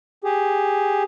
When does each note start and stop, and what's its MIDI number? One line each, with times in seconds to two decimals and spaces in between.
0.24 1.03 67
0.24 1.03 68